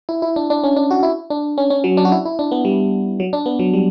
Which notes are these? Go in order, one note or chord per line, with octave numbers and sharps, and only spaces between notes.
E4
E4
D4
D4
C#4
D4
F#4
E4
D4
C#4
C#4
F#3
D4
F#4
E4
E4
D4
B3
G3
F#3
D4
B3
F#3
G3